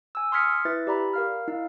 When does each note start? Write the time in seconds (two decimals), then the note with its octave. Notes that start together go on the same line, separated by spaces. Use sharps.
0.15 G#5 E6
0.32 C6 D#6 F6 G#6 B6 C#7
0.65 E4 B4 E5 A6
0.87 G4 D5 A#5 B5
1.13 A#4 F5 F6
1.48 D#4 E4 F5